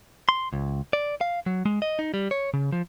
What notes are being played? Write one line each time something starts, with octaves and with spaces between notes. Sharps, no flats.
C6
C#2
D5
F5
F#3
G#3
D#5
D#4
G3
C#5
C#3
F3